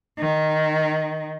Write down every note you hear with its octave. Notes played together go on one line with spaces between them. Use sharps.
D#3